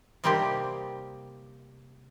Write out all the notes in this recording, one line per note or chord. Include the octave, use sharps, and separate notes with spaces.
C3 G3 A#3 C4 D#4 G4